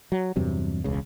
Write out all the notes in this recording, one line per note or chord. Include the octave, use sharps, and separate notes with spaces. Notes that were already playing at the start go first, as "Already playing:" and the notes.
F#3
E2 G2 C3 F#3
E1 C#2 C#3